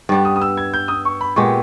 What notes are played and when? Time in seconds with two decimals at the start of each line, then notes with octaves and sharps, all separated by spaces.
0.09 G2 G3 B3 G5
0.25 D#6
0.36 D#6
0.41 E6
0.57 G#6
0.73 G6
0.88 D#6
1.05 C#6
1.21 B5
1.36 A#2 G#3 B3 G4 C#6